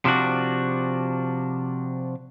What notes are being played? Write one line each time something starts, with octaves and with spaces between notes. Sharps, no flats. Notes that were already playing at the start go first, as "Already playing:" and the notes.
C3 F3 D4 F#4